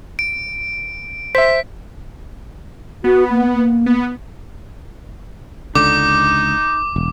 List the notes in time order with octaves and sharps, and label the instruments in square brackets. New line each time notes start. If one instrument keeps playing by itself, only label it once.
[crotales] D7
[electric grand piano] C5 E5 [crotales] B6
[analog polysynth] B3 [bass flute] F#4
[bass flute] A#3
A#3
[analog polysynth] B3
[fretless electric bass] C#2 D3 [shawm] D#4 [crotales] D6
[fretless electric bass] E1